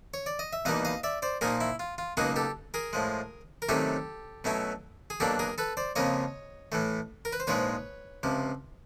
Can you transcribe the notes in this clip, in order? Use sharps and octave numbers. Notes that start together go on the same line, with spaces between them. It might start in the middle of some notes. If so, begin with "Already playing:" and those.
C#5
D5
D#5
E5
E2 B2 G3 A#3 D#4 D#5 F5
D#5 F5
D5 E5
C5 D5
A#2 F3 A#3 D#4 G#4 A#4
E4
F4
F4
C#2 B2 F#3 A#3 D#4 F#4 G#4
G4 A4
G#4 A#4
A2 F3 G#3
A#4
C3 D#3 F#3 A3 C#4 G4 A4
B2 F#3 A3 C#4 E4
G#4
B2 F#3 A#3 D4 G4 A4
G#4 A#4
A4 B4
C5 D5
F2 C#3 F3 A#3 C#5 D#5
A2 E3 A3
A#4
B4
C5
A#1 G#2 F3 G#3 B4 C#5
C#2 C3 F3